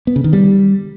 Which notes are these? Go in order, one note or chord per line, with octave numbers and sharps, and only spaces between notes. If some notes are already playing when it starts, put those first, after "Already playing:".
B3
C#3
D#3
G3